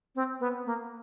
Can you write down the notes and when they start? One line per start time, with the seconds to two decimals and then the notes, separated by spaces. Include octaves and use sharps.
0.15 C4
0.40 B3
0.66 A#3